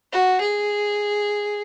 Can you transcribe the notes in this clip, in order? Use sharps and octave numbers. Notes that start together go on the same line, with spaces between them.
F#4
G#4